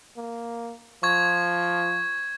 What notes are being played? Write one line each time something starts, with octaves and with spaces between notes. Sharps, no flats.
A#3
F3 C#6 G#6